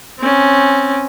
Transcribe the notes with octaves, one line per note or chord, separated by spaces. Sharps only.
C4 C#4